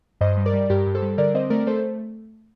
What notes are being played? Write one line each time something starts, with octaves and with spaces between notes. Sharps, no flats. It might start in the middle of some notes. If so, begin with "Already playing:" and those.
G2 C5 D#5
G3
A#4 D5
G3
G2 G4 A#4
G2
A4 C5
G3
D3 A#4 D5
C4 C5 D#5
A3 A#4 D5
A3 A4 C5